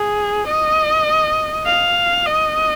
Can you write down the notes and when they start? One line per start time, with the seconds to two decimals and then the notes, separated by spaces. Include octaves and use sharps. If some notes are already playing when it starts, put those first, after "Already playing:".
Already playing: G#4
0.47 D#5
1.66 F5
2.26 D#5